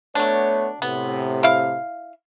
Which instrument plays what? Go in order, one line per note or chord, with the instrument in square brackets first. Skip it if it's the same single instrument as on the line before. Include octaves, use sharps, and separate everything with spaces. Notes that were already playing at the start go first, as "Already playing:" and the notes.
[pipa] F#3 D4 [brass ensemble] A3 B3 C#5
[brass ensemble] A2 C3 [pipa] B3
[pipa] E4 F5